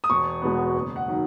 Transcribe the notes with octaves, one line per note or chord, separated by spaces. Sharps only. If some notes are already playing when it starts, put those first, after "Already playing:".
D#6
E1 C#6
E2 B2 G#3 B3
F#1
F#5
D#3 F#3